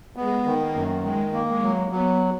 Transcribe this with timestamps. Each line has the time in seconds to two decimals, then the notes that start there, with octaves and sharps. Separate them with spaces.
0.16 G#3 B3
0.46 D#3
0.60 A#3
0.75 F#2
1.03 D#3 G#3
1.33 A#3
1.48 G#3
1.62 F#3
1.91 F#3 B3